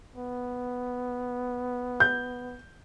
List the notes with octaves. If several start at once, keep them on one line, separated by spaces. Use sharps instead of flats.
B3
G6